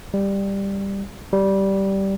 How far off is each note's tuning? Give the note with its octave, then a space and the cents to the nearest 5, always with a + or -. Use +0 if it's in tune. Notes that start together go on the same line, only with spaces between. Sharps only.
G3 +10
G3 -10